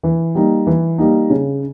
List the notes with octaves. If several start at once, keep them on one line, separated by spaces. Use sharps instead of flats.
E3
G3 A#3 D#4
E3
G3 A#3 D#4
C#3